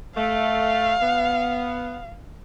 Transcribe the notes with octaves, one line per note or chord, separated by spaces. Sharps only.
A3 F5
B3